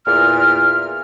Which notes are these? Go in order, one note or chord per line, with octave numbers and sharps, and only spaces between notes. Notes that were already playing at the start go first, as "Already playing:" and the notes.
E2 A#2 F6